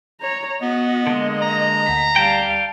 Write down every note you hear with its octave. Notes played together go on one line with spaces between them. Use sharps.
C#5 A#5
B3 F#4 D#5
D3 G#3 A#3 D#5
A#5
D2 B6
G3 F5 G5 A5